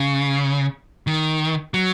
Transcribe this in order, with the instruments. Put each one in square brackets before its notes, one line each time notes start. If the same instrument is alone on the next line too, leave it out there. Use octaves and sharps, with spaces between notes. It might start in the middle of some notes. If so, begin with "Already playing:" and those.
Already playing: [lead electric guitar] C#3
D#3
F#3